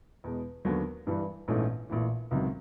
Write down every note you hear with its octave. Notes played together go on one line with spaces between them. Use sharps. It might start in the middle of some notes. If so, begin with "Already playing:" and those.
E2 B2 G#3
D#2 D3 F#3 B3
G2 E3 G3
A#1 G#2 E3 A3 C#4
A#1 A2 E3
C#2 C3 D#3 F#3